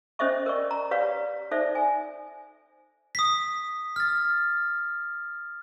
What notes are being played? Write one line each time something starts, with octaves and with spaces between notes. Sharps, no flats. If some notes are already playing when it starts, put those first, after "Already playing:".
C#4 A4 C5 D#5 E5 C#6
A#4 D5 C#6
A#5
G4 B4 C#5 D5 F5
D#4 A4 C5 D5 E5
G#5
D#6 B6
F6 A6